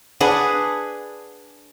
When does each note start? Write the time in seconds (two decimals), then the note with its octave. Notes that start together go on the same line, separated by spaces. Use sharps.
0.20 D4 G#4 B4 F#5